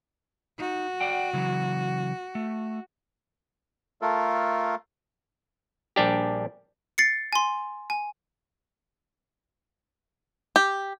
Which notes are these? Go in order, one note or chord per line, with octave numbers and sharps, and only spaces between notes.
D#4 F#4
D5 F#5 G5
C#3 E3 F#3
A3
A3 F4 A4 A#4
A#1 G3 D4 G4
A6 C7 C#7
G#5 C6
G#5
G4